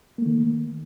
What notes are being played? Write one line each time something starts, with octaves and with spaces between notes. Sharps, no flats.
D#3 A3 A#3